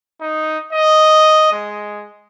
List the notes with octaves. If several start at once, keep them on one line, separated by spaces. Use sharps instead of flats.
D#4
D#5
G#3